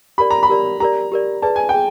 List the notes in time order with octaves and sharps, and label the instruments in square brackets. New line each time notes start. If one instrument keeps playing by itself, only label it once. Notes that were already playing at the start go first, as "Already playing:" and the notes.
[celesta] G4 A#4 D5 [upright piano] B5
[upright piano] A#5
B5
[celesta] G4 A#4 D5
[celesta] G4 A#4 D5 [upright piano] A#5
[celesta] G4 A#4 D5
[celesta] G#4 B4 D5 [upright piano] A5
[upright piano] G#5
[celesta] G#4 [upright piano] G5